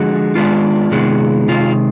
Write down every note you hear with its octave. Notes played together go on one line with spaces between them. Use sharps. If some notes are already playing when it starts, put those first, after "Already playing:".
Already playing: D3 F3 G#3 F#4
D#3 G#3 B3 D4 F4
C3 D#3 G#3 B3
C3 D#3 G#3 F4